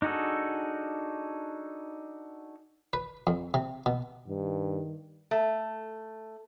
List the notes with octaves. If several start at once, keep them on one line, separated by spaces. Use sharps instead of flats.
D4 D#4 F#4 G#4 A4
B4
F2
C3
B2
G2 D#3
A3